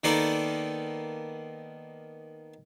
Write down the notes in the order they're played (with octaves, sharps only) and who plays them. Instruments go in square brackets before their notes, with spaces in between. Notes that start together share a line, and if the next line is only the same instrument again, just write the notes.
[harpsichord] D#3 A#3 B3 D#4 A4 D5